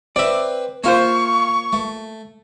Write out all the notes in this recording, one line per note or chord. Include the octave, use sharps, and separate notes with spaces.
C4 B4 D5 E5
A#3 F4 C5 E5 F5 C#6
A3